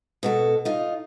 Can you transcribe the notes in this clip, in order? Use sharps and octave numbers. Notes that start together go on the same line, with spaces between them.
B2 F#4 A4
D#4 F4